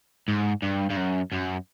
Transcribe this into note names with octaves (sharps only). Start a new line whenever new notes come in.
G#2
G2
G2
F#2
F#2